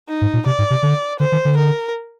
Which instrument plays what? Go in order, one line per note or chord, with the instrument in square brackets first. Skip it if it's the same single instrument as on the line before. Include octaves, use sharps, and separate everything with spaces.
[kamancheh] D#4
[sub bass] G#2
A#2
[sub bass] C3 [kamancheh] D5
[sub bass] G#2
C3
D3
[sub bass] D3 [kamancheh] C5
[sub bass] D#3
D3
[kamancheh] A#4